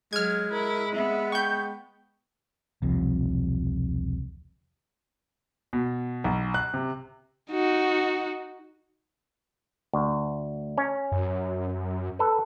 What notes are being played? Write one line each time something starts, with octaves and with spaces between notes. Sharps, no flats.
F#3 G#3 F6 G#6
E4 A#4
B3 E5
G5 C#6 G6
E1 C2 C3 F3
B2
B1
F#6
C3
D#4 F#4
D2
C#4
F#2
A4 B4